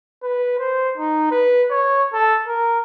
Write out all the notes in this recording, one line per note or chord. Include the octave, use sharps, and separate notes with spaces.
B4
C5
D#4
B4
C#5
A4
A#4